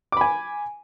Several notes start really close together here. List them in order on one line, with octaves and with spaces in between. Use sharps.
D6 B5 G#5